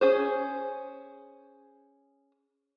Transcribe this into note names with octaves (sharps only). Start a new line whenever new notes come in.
C#4 G#4 C5